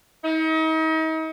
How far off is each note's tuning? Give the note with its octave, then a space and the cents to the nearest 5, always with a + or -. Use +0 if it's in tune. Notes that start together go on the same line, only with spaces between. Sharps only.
D#4 +40